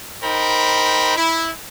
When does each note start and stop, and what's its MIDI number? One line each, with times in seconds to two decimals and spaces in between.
0.23 1.14 63
0.23 1.14 70
0.23 1.14 72
0.23 1.14 79
0.23 1.14 83
1.16 1.49 64